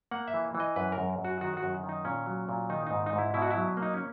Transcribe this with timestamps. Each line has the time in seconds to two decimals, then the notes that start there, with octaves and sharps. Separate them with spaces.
0.11 A#3 F#5
0.28 E5
0.34 E3
0.55 E3
0.60 D#5
0.76 F#2 B4
0.92 A#4
0.98 F#2
1.19 F#2
1.25 F#4
1.41 D#3 F#4
1.57 F#4
1.63 F#2
1.84 D#3
1.89 D#4
2.05 A#2 C#4
2.26 F#3
2.49 A#2
2.70 D#3 D#4
2.87 G#2 D#4
3.06 D#4
3.13 G#2
3.18 E4
3.34 B2 E4
3.42 F#4
3.51 F#3 E4
3.77 A#3
3.83 D#4
3.94 C#4